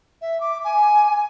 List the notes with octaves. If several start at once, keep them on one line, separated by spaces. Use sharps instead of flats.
E5
D6
G#5